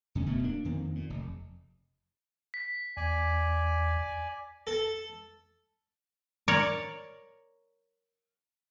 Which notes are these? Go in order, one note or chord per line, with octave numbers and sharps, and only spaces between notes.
F2 D3 C#4
D1 D2 B2 A3
A#3 D4
F2 D#3 A#3 C4
A#2
F1
B6
E2 D5 G#5
A4
A#4 C#5 D5